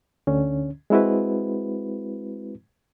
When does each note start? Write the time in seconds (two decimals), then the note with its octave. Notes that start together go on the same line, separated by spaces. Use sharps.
0.27 D2 D3 C#4
0.90 G#3 C4 E4 F#4 B4